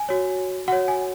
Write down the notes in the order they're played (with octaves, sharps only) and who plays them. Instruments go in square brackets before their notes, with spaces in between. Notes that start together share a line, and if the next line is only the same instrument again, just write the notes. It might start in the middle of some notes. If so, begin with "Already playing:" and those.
Already playing: [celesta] G#5
F#4 C#5
F#4 C#5 F#5
G#5